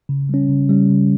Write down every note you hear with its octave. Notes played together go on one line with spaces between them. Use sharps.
C#3
G3 C#4
C#3
G3 C#4
C#3